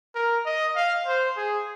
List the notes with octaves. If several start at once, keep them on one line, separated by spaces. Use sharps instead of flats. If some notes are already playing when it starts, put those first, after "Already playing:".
A#4
D#5
F5
C5
G#4